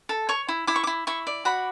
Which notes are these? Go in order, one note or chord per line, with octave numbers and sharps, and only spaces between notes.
A4
C#5 C#6
E4
E4 D6
C#6
D6
E4
E4 C#6
D5
F#4 B5